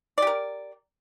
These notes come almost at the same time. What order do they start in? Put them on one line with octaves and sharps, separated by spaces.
D5 G4 A#4